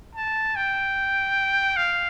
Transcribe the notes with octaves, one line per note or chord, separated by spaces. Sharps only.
A5
G5
F5